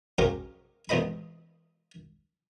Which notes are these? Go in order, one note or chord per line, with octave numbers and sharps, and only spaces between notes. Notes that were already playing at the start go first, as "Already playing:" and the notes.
C#3 F#3 G4 A#4 C5
A1 E2 G#2 C5 D#5 B5